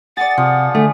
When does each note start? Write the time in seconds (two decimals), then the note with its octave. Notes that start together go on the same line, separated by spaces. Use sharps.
0.17 G#4 D5 F#5 A6
0.38 C3 F3
0.75 D3 A3 G#4